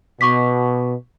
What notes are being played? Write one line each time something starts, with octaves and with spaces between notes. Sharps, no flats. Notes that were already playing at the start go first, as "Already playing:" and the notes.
B2 C#6 D6 B6